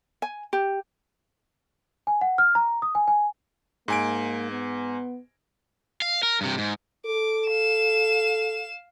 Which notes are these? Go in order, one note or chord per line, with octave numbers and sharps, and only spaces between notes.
G#5
G4
G#5
F#5
F6
A#5
D#6
G#5
G#5
G#2 A#3 G#5 D7
B3
F5
A#4
G2 C3
G#2
A4 D6
F5 E7